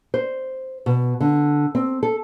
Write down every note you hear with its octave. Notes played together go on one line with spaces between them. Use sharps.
C5
B2
D3
C4
A4